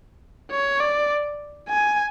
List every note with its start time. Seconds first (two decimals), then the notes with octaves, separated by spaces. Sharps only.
0.51 C#5
0.80 D5
1.68 G#5